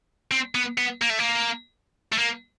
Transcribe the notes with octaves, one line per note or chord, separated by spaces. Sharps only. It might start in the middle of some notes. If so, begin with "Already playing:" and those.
C4
B3
B3
A#3
A3
A#3
A3
A#3